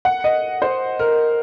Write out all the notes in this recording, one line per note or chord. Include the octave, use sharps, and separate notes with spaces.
F#5
D#5
C5
A#4